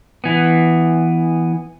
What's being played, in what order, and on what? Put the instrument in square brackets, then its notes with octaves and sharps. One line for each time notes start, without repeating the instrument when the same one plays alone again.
[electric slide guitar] E3 B3